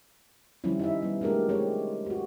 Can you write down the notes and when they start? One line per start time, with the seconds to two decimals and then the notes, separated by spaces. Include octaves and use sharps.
0.64 D#3 F3 G3 C4 C#4 E4
0.79 D#4 E4 E5
1.02 G3 B3
1.21 G#3 A3 D4 G4 A#4
1.49 G#3 C4 G4 C#5
2.06 F#4 G4